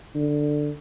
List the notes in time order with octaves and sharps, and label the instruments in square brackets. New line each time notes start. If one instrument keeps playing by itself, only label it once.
[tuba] D3